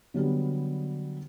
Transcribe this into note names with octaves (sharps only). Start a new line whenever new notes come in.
D3 F#3 G3 B3